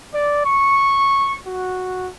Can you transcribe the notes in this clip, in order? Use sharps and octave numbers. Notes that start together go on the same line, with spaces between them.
D5
C#6
F#4